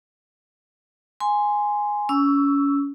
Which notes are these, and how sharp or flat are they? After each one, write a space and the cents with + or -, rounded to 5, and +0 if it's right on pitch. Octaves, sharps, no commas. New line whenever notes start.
G#5 +0 C6 -10
C#4 +25 C#6 +40 E6 +0